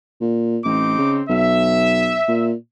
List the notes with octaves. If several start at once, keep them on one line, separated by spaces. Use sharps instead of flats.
A#2
A1 C4 D#4 D6
C#3
B1 E5
A#2